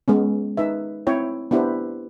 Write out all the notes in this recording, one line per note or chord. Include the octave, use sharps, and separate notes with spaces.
G#3 B3 C#4
D#4 B4 E5
C4 E4 C#5 G5
B3 D4 E4 G4 B4 C5